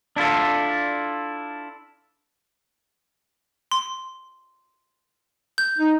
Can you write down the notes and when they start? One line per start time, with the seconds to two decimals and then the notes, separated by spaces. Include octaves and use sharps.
0.16 D4 E4 F4 A4
3.72 C6
5.58 G6
5.78 D#4